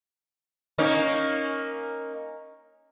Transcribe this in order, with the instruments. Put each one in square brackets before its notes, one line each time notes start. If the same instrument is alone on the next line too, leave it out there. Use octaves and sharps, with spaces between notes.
[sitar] A#3 C#4 D#4